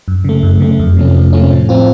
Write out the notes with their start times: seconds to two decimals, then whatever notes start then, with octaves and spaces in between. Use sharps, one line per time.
0.08 F#2
0.25 C#3 A3
0.43 F#2
0.60 C#3 A3
0.79 F2
0.97 C3 F3 A3 C#4
1.15 F2
1.33 C3 F3 A3 C#4
1.51 A2
1.69 F3 C4 F4